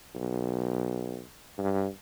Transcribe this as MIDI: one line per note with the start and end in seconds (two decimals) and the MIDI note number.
0.15 1.20 35
1.58 1.87 43